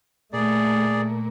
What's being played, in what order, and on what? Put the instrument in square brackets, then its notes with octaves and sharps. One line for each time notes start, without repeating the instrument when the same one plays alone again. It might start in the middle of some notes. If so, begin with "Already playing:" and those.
[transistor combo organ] A#2 [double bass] A3 [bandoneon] G#4 D5